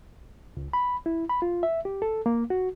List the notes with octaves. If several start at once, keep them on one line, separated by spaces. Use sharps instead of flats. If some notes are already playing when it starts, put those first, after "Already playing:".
C#2
B5
E4
B5
F4
E5
G4
A4
A#3
F#4